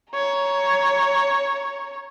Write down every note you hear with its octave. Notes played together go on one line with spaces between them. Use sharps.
C#5 A#5